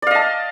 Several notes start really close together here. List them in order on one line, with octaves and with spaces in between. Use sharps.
D5 F5 D#5 A5